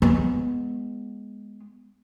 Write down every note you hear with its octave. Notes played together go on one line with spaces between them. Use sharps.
G#3 B3